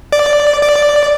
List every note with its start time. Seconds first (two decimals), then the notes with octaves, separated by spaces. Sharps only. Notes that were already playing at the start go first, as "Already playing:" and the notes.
0.12 D5
0.62 D5